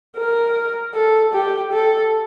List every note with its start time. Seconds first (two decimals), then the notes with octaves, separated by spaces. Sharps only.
0.17 A#4
0.95 A4
1.34 G4
1.73 A4